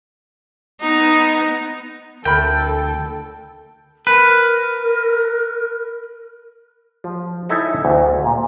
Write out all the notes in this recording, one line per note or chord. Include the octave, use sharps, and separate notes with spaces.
B3 D#4
D2 A4 A#4 G5 B5
A#4 B4
F3
D#4 E4 A4 C#5 E5 G#5
D2
A#2